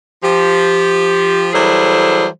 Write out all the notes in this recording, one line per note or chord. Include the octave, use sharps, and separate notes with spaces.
F3 G4
E3 F#3 G3 G#4 A4 C5